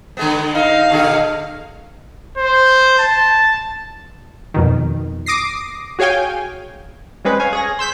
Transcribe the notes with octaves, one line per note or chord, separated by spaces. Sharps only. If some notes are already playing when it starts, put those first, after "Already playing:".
D3 G#3 B3
D#4 D#5 F5
A#2 D3 G#4
C5
A5
F2 B2 D#3
D6 D#6 A#6 C7
F#4 G#4 C#5 F5 G5 G#5
G3 G#3 C4 C#4 G#4 B4
C#5 F5 G#5
G#4 C#5 A#6
C6 E6 G6 B6